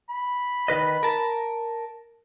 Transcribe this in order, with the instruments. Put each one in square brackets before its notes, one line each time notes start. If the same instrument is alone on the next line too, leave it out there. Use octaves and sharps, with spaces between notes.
[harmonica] B5
[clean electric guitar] D#3 B4 D#5
A#4 A5